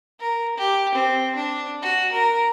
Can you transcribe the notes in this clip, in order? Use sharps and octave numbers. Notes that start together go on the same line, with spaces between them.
A#4
G4
C4
D4
F#4
A#4